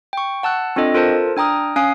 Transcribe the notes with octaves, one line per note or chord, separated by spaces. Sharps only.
G5 C#6
F#5 A5 E6 F#6
C4 D4 F4 A4 D#5
F4 A4 A#4 C5 A5
D4 G5 A#5 D#6 F6
C#4 F5 G#5 D#6 C7